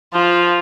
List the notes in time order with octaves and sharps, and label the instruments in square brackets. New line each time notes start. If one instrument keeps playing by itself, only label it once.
[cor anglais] F3 [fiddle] F4